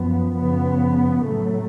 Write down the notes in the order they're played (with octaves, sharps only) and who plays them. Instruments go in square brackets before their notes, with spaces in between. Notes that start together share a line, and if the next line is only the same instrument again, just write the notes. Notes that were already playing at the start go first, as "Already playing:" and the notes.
Already playing: [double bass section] F#2 F3 B3
F#2 C#3 F3 B3
A2 F#3 A3